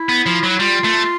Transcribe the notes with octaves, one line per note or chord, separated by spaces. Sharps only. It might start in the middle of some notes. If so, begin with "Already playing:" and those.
Already playing: E4
B3
F3
F#3
E4
G3 F4
A3